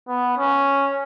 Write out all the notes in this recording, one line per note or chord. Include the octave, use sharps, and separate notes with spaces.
B3
C#4